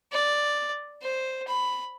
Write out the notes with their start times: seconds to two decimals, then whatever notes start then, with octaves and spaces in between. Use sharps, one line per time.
0.12 D5
1.02 C5
1.48 B5